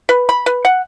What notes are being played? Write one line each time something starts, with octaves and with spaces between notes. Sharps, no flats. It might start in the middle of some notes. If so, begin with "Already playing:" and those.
B4
B5
B4
F#5